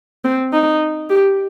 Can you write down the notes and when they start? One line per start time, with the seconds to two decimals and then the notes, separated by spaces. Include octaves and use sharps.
0.24 C4
0.53 D#4
1.10 G4